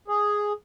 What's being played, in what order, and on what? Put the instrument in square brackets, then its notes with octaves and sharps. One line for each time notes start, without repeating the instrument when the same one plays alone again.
[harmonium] G#4